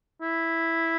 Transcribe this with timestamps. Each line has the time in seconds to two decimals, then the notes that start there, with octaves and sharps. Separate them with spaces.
0.22 E4